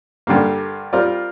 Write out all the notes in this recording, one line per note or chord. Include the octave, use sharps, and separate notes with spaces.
G2 D3 G3 A#3
G3 C4 F4 A#4 D5